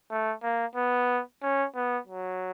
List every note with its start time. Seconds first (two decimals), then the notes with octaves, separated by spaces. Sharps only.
0.10 A3
0.43 A#3
0.75 B3
1.43 C#4
1.76 B3
2.07 F#3